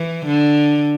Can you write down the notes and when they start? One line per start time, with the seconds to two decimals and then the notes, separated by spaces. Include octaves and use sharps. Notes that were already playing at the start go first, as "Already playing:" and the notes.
Already playing: E3
0.26 D3